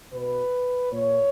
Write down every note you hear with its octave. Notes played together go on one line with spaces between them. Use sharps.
B2 B4
A#2 C#5